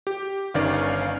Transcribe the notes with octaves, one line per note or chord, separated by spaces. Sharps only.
G4
G1 D#3 C#4 D5 F5